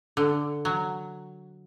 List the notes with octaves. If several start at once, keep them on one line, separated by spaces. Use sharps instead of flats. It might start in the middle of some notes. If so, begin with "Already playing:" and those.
D3
F#3